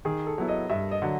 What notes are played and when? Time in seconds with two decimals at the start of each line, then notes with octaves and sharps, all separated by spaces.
0.05 D#3 G#4
0.27 A4
0.38 F#3 B3 E4
0.48 D#5
0.70 G2 E5
0.91 D#5
1.02 D3 F#3